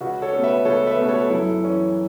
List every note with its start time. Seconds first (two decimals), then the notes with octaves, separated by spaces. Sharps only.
0.01 C#2 F#4
0.22 A4 C#5
0.33 B2 A3 C#4
0.44 B4 E5
0.65 C#2 A4 C#5
0.87 B4 E5
0.98 B2 A3 C#4
1.08 A4 C#5
1.30 F#2 E4 A4
1.62 E3 C#4